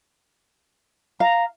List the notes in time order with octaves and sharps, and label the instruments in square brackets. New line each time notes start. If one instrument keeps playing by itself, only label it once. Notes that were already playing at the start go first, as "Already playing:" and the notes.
[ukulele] F5 [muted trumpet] A#5